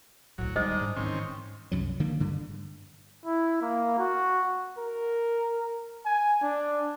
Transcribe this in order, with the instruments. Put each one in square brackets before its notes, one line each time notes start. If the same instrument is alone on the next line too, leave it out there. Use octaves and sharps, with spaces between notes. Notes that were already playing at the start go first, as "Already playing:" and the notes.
[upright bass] D2 A2 [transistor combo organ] F#3
[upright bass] D#2 G3 [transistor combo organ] G#3 D4 D#4 [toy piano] C5 D#5
[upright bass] G#2
[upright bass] G#2 E3 [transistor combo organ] D#3 C4 C#4
[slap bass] C2 F#2 F#3
D3 D#3 A#3
G2 D3
[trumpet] E4
A#3
F#4
[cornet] A#4
G#5
D4